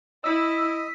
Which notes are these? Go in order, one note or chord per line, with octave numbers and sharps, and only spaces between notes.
E4 D#5 E6 B6